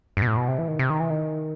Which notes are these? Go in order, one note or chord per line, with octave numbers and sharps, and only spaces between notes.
G2
B2
A2
B2
C3
E3
D#3
C3
D#3
E3
D#3